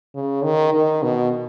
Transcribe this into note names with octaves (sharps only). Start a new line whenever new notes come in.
C#3
D#3
D#3
B2